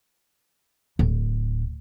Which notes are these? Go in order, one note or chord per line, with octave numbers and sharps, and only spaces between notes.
D1